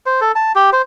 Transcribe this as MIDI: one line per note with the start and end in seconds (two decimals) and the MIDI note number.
0.06 0.20 72
0.21 0.32 69
0.35 0.52 81
0.55 0.70 67
0.73 0.82 72